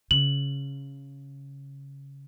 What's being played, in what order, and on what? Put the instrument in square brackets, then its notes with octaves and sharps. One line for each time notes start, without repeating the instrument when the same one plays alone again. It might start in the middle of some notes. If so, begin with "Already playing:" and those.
[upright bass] C#3 [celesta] F#7